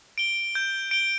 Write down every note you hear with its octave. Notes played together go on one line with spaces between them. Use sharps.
D7 G7
G6
D7 G7